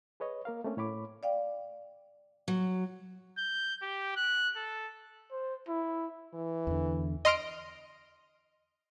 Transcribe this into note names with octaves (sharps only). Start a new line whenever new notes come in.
G#4 B4 C#5 D#5
A#3 A#4 F5
A3 A#3 C4 C#4
A2 C#5 B5 D6
D5 F5 G5
F#3
G6
G4
F#6
A4
C5
E4
E3
E2 D3
D#5 C6 F6 D7